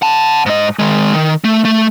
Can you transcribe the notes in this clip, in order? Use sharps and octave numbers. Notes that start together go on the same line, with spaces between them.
F#5 A5
G#2 D#5
D#3 G#3
D#3
A3
A3